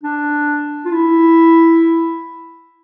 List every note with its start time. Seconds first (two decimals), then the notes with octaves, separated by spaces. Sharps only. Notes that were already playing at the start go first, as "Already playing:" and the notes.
0.04 D4
0.85 F4
0.92 E4